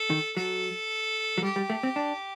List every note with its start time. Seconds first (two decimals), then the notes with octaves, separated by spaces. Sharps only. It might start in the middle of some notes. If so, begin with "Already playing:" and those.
Already playing: A4
0.10 D#3
0.36 F#3 A4
1.38 F#3
1.42 G3 G4
1.56 G3
1.70 A3
1.83 C4
1.96 D4